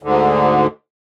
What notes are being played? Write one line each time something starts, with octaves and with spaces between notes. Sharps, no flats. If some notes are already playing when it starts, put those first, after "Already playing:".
D2 G#2 D3